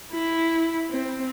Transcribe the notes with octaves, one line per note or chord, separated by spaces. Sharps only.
E4
C4